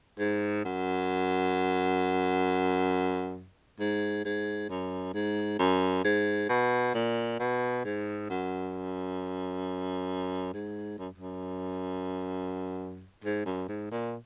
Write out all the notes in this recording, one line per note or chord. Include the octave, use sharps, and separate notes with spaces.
G#2
F#2
G#2
G#2
F#2
G#2
F#2
G#2
B2
A#2
B2
G#2
F#2
G#2
F#2
F#2
G#2
F#2
G#2
A#2